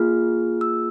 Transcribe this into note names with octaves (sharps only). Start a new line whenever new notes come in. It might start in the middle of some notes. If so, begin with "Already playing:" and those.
Already playing: A#3 F4 G#4 F6
E6